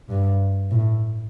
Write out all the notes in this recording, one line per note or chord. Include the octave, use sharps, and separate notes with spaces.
G2
A2